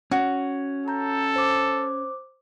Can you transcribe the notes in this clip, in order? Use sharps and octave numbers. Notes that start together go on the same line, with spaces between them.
C#4 F#4
A4 A5 A#5 G6
C5 D6